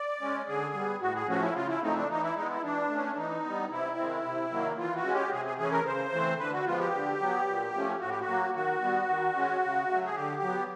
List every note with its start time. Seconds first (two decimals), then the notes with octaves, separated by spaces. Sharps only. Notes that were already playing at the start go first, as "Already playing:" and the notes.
Already playing: D5
0.21 G#3 C#4
0.48 D3 G#4
0.74 G3 B3
1.01 A2 F#4
1.15 G#4
1.28 F3 A3 C#4 F#4
1.41 E4
1.55 C#3 F4
1.69 E4
1.82 F3 A3 C4 D#4
1.96 D4
2.09 E3 D#4
2.23 E4
2.36 G#3 B3 D#4
2.50 E4
2.63 E3 D4
2.89 A3 C#4
3.13 D4
3.16 E3 D#4
3.43 G3 B3
3.70 C3 E4
3.98 D#3 G#3 C4
4.24 C3
4.51 D#3 F#3 A#3
4.78 E3 F4
4.96 F#4
5.04 G#3 C#4
5.14 G4
5.32 C3 G#4
5.45 G#4
5.58 E3 A3 C#4 G#4
5.72 A#4
5.86 C#3 C5
6.12 E3 A3 C4
6.39 D3 B4
6.53 F#4
6.66 F3 G#3 B3 F4
6.79 G4
6.93 D3
7.20 F#3 B3
7.47 A#2
7.74 F3 A3 C#4
8.00 A2 F#4
8.10 G4
8.20 F#4
8.27 F#3 A#3
8.54 D#3 F#4
8.82 G3 B3
9.08 D#3
9.36 G#3 C#4
9.62 C#3
9.89 F#3 A3
10.06 G#4
10.15 D3 G4
10.42 F#3 B3